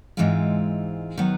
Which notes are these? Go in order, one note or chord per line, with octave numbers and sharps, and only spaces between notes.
G#2 E3 G#3 C4 F4
D#3 F#3 B3